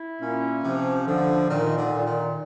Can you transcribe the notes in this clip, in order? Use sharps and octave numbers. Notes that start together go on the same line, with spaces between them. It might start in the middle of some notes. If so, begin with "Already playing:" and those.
Already playing: E4
A#2 C#4
C3 F3
D3 F3
A#2 D#3
D3
A#2
D#3